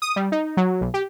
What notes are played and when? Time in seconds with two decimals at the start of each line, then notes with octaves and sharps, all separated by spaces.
0.02 D#6
0.16 G3
0.32 D#4
0.57 F#3
0.81 B1
0.94 G4